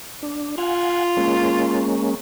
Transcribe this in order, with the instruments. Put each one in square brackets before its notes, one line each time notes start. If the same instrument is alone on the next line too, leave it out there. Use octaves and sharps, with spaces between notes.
[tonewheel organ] D4
[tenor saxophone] F4 [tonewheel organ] F5 F#5 G#5
[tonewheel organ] G#3 A#3 C#4